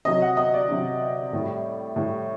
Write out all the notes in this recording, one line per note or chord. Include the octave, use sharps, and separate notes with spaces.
C3 F#3 D#5
F#5
D#5
D5
C3 F#3
A2 G3
A2 G3